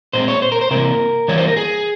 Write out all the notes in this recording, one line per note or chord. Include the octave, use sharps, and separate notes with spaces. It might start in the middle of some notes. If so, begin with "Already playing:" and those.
A#2 G#3 C4 C5
C#5
C5
A#4
C5
C3 E3 A#3 A#4
E3 G3 A#3 C#5
C5
A#4
G#4